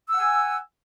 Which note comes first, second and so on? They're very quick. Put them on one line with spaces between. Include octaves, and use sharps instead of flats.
E6 F#5 G#5